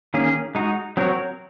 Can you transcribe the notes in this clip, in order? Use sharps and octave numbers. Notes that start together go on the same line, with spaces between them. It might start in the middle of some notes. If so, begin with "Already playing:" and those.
D#3 A#3 C#4 G#4
G#3 D#4 F#4
F#3 C4 F#4 A#4 C#5